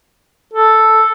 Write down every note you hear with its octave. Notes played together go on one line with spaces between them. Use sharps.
A4